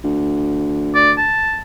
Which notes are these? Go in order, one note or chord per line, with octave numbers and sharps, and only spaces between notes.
D2
D5
A5